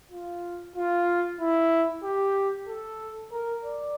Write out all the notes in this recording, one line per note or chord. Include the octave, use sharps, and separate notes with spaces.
F4
F4
E4
G4
A4
A#4
D5